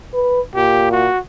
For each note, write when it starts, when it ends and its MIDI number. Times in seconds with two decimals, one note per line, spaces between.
0.13 0.40 71
0.55 1.08 46
0.55 0.91 67
0.91 1.19 66